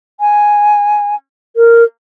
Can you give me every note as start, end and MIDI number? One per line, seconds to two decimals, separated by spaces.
0.20 1.15 80
1.56 1.84 70